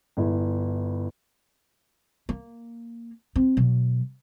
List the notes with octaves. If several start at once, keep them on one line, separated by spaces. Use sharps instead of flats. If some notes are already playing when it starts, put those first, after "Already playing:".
G1 E4
A#3
C4
B2 F#3